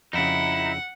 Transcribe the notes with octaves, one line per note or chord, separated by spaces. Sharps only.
F2 C#3 D#4 E4 F#5